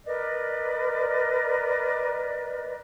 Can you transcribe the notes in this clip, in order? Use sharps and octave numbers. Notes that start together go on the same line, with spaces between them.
A#4 B4 D5 D#5